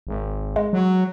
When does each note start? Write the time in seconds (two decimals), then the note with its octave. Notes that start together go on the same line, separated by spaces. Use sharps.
0.07 G#1
0.56 G#3
0.73 F#3